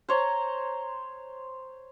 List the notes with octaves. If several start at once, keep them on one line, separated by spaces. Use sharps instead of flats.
C5 C#5 A#5